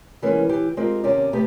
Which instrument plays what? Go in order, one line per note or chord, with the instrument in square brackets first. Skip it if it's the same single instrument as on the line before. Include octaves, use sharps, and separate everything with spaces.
[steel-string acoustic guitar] C3 E3 G#3 A#3 B3 C#4
C#3 E3 G4
G#3 C4 F4 G4 A#4
D#2 C3 A#3 C#4 G4 D5
C3 A3 B3 G4